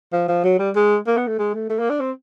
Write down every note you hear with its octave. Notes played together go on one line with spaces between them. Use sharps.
F3
F3
F#3
G3
G#3
A#3
B3
A3
G#3
A3
A3
A#3
D4
C4